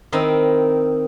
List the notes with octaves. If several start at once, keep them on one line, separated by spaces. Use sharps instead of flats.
D#3 C4 D#4 E4